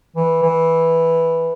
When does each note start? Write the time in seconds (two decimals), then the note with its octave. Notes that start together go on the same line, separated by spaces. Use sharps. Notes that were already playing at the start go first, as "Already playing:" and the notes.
0.16 E3
0.43 E3